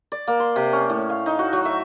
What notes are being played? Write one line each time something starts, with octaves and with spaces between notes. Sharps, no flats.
D5
A#3
C6
C3
C#4
A2
F5
D#4
F#4
F#3
E5